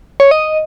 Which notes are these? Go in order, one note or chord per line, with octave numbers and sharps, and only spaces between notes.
C#5
D#5